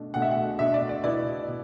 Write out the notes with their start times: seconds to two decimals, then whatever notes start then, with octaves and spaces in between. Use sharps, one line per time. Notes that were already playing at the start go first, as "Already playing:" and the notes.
Already playing: B2 A3 D4
0.14 B2 A3 D4 F#5
0.22 E5
0.31 F#5
0.59 B2 A3 D4 E5
0.74 D5
0.89 D5
1.03 B2 B3 E4 D5
1.48 B2